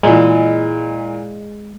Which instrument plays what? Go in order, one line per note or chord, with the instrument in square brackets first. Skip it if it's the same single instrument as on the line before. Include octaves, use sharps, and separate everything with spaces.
[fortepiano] A#2 E3 [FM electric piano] G#3